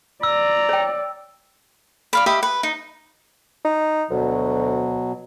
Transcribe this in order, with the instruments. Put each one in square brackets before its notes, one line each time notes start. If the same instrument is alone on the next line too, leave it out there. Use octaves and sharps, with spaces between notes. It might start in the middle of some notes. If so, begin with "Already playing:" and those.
[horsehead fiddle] D5 [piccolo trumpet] A#5 [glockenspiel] E6
[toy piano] C#5 G5
[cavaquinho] D5 F5 B5
G4 D#5 E5 B5
B4
D#4
[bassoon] D#4
[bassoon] D2 [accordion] B2 F#3